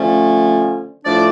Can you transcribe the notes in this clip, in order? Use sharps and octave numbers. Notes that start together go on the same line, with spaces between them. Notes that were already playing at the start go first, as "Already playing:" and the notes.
Already playing: D3 F3 A3 C#4
A2 F3 A3 D4 D5